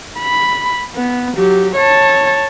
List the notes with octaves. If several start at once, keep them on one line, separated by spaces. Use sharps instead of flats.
B5
B3
F#3 G4
C#5 A5